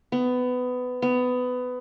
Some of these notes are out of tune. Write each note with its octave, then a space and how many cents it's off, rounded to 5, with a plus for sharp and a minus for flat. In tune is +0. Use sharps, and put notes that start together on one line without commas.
B3 +20
B3 +20